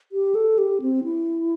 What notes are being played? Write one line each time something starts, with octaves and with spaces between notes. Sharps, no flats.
G4
A4
G4
C4
E4